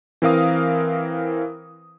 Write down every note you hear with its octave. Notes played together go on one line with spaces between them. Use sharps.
E3 C4 A#4 F5 D#6